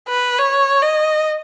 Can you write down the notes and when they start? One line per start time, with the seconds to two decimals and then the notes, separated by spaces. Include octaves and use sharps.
0.09 B4
0.39 C#5
0.82 D#5